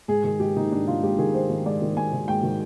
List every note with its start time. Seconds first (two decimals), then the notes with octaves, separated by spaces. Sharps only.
0.08 G#2 G#4
0.24 D#3 G#4
0.40 G#2 G4
0.56 D#3 D#4
0.72 G#2 D4
0.87 D#3 F4
1.03 G#2 G4
1.19 D#3 G#4
1.34 G#2 C5
1.50 D#3
1.65 G#2 D5
1.82 D#3
1.97 G#2 G#5
2.13 D#3
2.28 G#2 G5
2.43 D#3